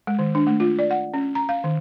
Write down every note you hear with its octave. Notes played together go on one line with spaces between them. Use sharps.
G#3
D#3
D4
A3
F4
D5
F#5
C#4
A#5
F5
D#3